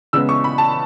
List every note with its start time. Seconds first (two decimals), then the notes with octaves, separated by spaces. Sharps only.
0.13 C#3 G#3 B3 E6
0.29 C#6
0.44 B5
0.58 A5